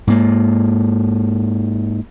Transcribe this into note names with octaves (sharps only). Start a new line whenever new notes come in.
G#2 A#3